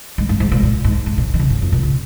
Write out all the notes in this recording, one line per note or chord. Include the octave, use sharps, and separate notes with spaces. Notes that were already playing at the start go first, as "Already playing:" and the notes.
G#2
G#2
G#2
A#2
A#2
G#2
G#2
A#2
D#3
C#3
G#2
F2
A#2
C#3